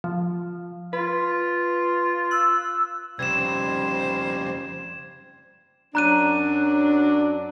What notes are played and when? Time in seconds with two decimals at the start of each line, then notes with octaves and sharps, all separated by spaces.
0.04 F3
0.93 F4 B4
2.31 E6 F#6
3.19 F2 C#3 G3 C5 G#6 E7
5.95 F#2 F#3 D4 A#5 F#6 D#7